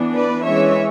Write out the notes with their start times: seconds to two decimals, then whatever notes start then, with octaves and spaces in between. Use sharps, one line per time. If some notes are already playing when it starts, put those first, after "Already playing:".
Already playing: E3 B3 D4
0.14 B4 D5
0.44 E3 G#3 C#4 C#5 E5